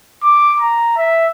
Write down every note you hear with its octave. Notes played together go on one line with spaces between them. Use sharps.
D6
A#5
E5